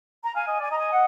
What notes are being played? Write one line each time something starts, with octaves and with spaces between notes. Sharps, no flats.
A#5
F5 G#5
D#5
D5 G#5
D#5 A#5
G#5
F#5